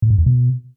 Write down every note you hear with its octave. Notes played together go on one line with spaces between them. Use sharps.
A2
G#2
E2
B2